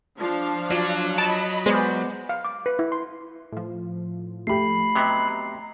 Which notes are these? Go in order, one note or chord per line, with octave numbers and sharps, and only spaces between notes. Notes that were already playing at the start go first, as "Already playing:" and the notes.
F3 D4 F5
F#3 F4 D5
D#5 A5 B5 D7
G#3 B3 C5 D5
F5
D6
B4
E4
C6
A2 F3
A3 G4 B5 C7
C3 F#3 B3 D#5 A#5